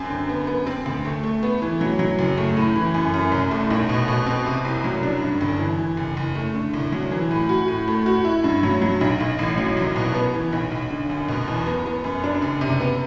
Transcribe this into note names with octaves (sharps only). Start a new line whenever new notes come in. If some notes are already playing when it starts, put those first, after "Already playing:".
Already playing: F#2 C4
D3
B3
B3
C4
D2
A3
A3
B3
E3
F#3
F#3
F#1
A3
A2
E3
F#2
F#2
C2
A3
B1
B2
B2
C4
C3
C2
F#3
D4
G2
G1
E3
E3
F#1
F#1
A3
D3
C2
F#3
E3
A2
F#4
A2
A3
F#4
E4
G2
F#3
F#3
B1
B1
A1
F#3
C2
B2
B3
E3
B1
B1
D3
F#2
B2
E2
B3
B3
F#2
D4
F#1
C3
B3